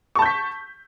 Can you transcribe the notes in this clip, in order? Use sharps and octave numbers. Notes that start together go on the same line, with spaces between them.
A5 C#6 G6 B6